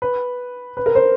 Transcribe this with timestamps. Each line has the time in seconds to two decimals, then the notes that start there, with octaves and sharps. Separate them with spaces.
0.02 B4
0.77 B4
0.86 A#4
0.95 C5